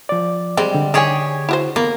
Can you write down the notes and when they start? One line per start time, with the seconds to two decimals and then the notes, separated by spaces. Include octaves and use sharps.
0.09 F3 D5
0.57 G3 G#3 C4
0.74 D3
0.94 D#3 G4 G#4 C#5 G#5
1.49 E4 F#4 C5
1.76 A#3 B3